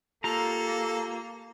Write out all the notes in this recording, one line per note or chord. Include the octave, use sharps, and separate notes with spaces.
A#3 F4 G4 A4 A#5